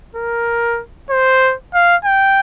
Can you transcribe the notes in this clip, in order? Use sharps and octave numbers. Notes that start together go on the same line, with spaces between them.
A#4
C5
F5
G5